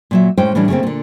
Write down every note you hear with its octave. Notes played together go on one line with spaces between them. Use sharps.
A#2 F#3 E5
A2 G#3 C#4 C5 G5
A2 E3 G3 C#4 D4
C#3 G3 A3 A#3 C4
A#2 D3